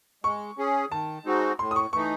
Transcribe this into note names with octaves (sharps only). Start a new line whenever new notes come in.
G#3 C#6
C#4 G#4
D#3 A5
G#3 C4 D#4 F#4
A2 C6
D#6
C#6
E3 A3 D#4 C#6